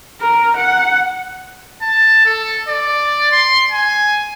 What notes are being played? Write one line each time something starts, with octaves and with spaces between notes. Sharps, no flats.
A#4
F#5
A5
A4
D5
C6
G#5